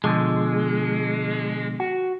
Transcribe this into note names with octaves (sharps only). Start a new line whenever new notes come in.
B2 D3 F3 G#3
F#4